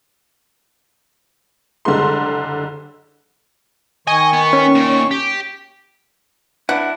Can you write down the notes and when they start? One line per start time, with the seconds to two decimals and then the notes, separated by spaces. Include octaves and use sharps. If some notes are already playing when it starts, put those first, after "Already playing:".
1.85 F#1 D3 G3 G#3 C6
4.07 D#3 D#5 G#5 C#6
4.33 B3
4.53 C#4
4.75 A#2
5.11 G4
6.69 D4 E4 F#5